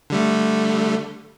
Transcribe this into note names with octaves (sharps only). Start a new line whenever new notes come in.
D3 G3 A3